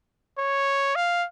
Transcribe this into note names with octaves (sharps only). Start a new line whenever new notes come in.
C#5
F5